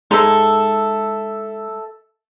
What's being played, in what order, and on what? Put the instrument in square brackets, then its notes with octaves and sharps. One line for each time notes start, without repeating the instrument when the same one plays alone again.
[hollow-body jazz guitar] G#3 D#4 C6 [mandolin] A4 E5